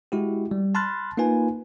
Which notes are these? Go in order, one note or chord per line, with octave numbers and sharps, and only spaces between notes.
G#3 E4 F#4 G4
G3
A5 B5 C6 F6 F#6 A6
A#3 D#4 F4 B4 G#5